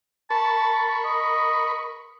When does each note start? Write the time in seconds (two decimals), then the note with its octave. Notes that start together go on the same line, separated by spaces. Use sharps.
0.30 A#4 A5 B5 C#6
1.05 D#5